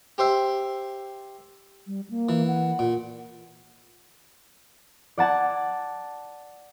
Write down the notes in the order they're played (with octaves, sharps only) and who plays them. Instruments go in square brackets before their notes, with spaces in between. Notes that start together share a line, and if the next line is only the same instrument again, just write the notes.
[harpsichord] G4 C5 E5
[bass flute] G3
A#3
[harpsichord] E3
[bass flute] F#5
[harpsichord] A#2
[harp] D5 F#5 A5 G#6